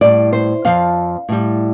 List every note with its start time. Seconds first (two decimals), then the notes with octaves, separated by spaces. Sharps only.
0.01 A2 G3 D5
0.33 C5
0.65 F2 F3 F5
1.29 A2 G3